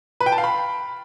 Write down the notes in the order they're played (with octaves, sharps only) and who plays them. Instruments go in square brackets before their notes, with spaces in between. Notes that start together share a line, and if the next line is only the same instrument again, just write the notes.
[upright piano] B4
G5
A5
F5
B5